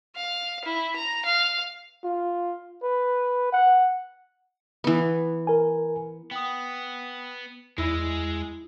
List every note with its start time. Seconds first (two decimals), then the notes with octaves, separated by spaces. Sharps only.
0.16 F5
0.65 E4
0.96 A#5
1.25 F5
2.04 F4
2.83 B4
3.52 F#5
4.84 E3 B3
5.47 A#4 G#5
6.31 B3 G5 D#6
7.78 E2 G#3 E4 G#4 E6 A#6